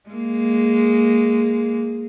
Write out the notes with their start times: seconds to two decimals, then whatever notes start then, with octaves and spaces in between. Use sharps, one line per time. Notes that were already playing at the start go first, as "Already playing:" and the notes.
0.10 G#3 A#3